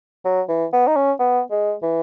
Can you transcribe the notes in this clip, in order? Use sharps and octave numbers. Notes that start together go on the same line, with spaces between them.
F#3
E3
B3
D#4
C#4
B3
G#3
E3